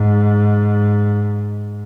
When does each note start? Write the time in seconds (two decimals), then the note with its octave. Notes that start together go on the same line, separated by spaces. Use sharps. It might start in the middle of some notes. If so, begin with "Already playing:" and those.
Already playing: G#2